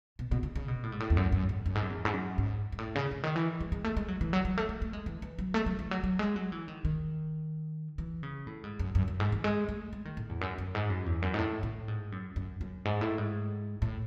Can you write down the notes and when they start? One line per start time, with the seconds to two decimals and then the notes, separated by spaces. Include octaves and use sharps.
0.19 B2
0.32 B2
0.43 C#3
0.56 C#3
0.68 B2
0.83 A2
0.92 G#2
1.00 A2
1.10 E2
1.17 F#2
1.32 F#2
1.49 G#2
1.66 F#2
1.75 G#2
1.83 F#2
1.90 E2
2.05 G#2
2.13 F#2
2.38 G#2
2.72 G#2
2.78 A2
2.95 C#3
3.11 C#3
3.23 D#3
3.36 E3
3.60 G#3
3.72 G#3
3.84 A3
3.97 G#3
4.08 F#3
4.21 E3
4.33 F#3
4.45 F#3
4.57 A3
4.69 A3
4.82 A3
4.93 G#3
5.06 E3
5.22 E3
5.39 F#3
5.54 A3
5.66 F#3
5.79 E3
5.91 F#3
6.04 F#3
6.19 G#3
6.36 F#3
6.52 E3
6.68 D#3
6.85 D#3
7.98 E3
8.23 C#3
8.47 A2
8.64 G#2
8.79 F#2
8.95 F#2
9.08 F#2
9.20 G#2
9.32 E3
9.44 G#3
9.69 A3
9.93 G#3
10.05 D#3
10.17 A2
10.29 E2
10.41 F#2
10.58 F#2
10.75 G#2
10.90 F#2
11.06 E2
11.22 F#2
11.34 G#2
11.38 A2
11.63 A2
11.88 G#2
12.12 F#2
12.36 F#2
12.61 F#2
12.85 G#2
13.01 A2
13.18 G#2
13.82 A2